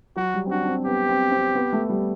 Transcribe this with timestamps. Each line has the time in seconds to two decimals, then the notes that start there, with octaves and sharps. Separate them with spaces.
0.16 F#3 F#4
0.34 G3
0.46 C4
0.51 D4 F#4
0.64 D4
0.68 C4
0.86 B3 G4
1.09 C4
1.32 C4
1.55 B3
1.73 A3
1.89 G3